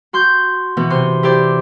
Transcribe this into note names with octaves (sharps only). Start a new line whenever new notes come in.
F#4 C6 G6
B2 E3 B3
C3 C6
E4 G4 C5 D5